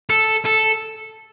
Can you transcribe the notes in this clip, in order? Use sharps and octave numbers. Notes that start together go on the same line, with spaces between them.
A4
A4